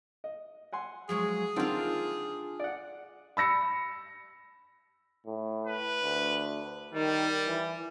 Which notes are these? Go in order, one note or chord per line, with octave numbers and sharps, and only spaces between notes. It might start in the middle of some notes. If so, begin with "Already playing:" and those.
D#5
F#5 G#5 C6
F3 F#3 G#3 G#4
D3 D#3 C4 D4 F4
D5 F#5
B5 E6 A#6 C#7
A2
B4
D2
D#3 G3
E3